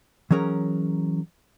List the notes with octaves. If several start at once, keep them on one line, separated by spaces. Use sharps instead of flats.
E3 F#3 C#4 G#4 A#4